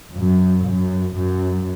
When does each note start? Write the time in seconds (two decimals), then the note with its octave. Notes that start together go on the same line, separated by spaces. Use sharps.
0.15 F#2
0.66 F#2
1.16 F#2